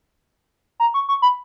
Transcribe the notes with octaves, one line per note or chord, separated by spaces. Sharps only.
A#5
C#6
C#6
B5